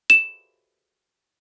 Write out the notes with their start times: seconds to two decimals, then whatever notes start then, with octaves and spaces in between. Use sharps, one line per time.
0.10 E7